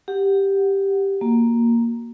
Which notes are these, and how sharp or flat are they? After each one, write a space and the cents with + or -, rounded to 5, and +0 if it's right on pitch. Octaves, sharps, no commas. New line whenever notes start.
G4 +0 F#5 +0
A#3 +0 F#4 +0